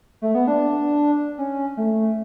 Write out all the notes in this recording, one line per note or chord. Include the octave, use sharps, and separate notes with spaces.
A3
B3
D4
C#4
A3